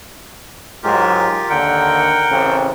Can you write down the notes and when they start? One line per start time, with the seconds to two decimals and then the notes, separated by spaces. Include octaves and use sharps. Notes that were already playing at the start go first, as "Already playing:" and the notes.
0.83 G#2 F#3 G#3 F4 G4 A#4
1.49 D#2 D3 A#4 F#5 G5
2.30 A1 C#3 C4